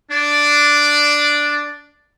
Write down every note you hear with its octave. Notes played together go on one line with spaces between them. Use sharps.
D4 D5